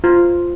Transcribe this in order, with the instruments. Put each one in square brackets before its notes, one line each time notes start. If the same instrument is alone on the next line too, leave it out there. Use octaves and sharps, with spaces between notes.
[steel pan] F4